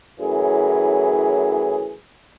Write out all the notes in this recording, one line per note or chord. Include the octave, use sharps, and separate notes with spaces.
F#2 A2 E3 G#4